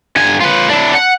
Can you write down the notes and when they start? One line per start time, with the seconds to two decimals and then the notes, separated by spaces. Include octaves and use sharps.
0.17 G2 G#5
0.41 F4 B4
0.70 D4 E4
0.95 F#5